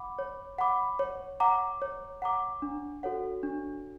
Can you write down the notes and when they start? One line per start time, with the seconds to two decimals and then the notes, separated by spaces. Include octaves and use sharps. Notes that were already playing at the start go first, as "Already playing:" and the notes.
Already playing: F#5 B5 D6
0.19 C#5
0.59 F#5 B5 D6
0.99 C#5
1.40 F#5 A#5 D6
1.82 C#5
2.22 F#5 A#5 D6
2.62 D4
3.03 F#4 A4 C#5 F#5
3.43 D4